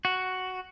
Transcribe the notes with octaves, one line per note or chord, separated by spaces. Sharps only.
F#4